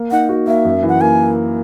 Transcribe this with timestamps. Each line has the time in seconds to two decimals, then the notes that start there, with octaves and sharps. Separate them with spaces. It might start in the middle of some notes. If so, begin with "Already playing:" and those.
Already playing: A#3
0.11 D#4 F#5
0.29 F#4
0.47 A#3 E5
0.65 F#2
0.83 E3
0.88 F#5
1.00 A#3 G#5